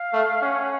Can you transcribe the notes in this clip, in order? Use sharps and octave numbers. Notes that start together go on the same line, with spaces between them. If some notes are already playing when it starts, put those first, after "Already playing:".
Already playing: F5
A3
C#4 F#5